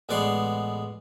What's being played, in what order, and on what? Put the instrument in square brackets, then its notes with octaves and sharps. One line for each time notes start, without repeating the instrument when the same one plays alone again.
[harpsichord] A1 G#3 B3 D5 F#5 C6